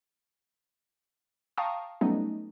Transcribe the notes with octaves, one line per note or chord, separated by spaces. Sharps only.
F5 G5 A5 A#5 C#6 D#6
F#3 G3 A3 B3 C#4 D#4